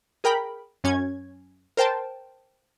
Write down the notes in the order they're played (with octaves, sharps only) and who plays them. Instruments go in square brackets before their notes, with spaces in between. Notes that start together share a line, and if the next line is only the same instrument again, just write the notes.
[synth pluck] G#4 A#4 G5 B5
F#2 C#4 G#6
A#4 C5 G5 A5